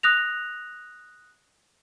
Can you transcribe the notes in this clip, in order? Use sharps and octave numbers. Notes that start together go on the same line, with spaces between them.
D#6 F#6 A#6 F7